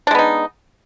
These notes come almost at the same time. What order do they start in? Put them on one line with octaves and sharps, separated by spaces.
D4 G#3 B3 D#4